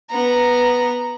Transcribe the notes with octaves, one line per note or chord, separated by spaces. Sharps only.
B3 A#5